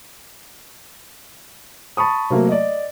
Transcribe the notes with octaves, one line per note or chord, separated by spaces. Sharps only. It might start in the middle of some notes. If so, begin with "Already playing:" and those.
A5 B5 C#6 D#6
C3 F#3 A3 A#3
D5 D#5